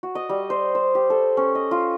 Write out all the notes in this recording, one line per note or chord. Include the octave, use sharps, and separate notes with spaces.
F#4
D#5
G3
C5
C5
G4
A4
C#4
D#5
F4